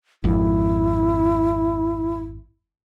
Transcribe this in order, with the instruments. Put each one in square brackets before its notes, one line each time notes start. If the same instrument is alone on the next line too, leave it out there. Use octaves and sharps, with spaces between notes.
[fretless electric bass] G#1 F2 [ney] E4